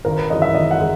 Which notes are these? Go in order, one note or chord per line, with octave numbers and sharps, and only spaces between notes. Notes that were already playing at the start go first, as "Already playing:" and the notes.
G#1 A#4
B4
F#2 E3 G#3 D#5
E5
G#1 D#5
F#5
G#3